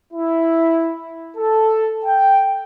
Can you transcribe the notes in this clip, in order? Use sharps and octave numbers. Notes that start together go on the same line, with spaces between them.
E4
A4
G5